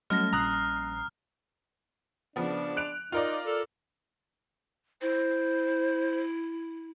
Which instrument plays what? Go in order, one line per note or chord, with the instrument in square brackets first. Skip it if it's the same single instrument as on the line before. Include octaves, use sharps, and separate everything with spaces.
[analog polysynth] F#3 A3 [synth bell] G3 C#4 A#6 [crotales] F6
[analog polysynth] A#1 C7 [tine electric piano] A#5 D#6 F#6
[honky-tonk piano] C#3 F3 B3 [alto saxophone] D4
[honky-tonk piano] F#6 D7 F7
[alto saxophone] D#4 [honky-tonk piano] F4 A#4 D5
[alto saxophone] A4
[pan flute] E4 [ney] C5